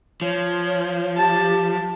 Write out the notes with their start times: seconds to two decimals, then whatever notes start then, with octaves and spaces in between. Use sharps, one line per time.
0.22 F3 C#5
1.17 G4 A5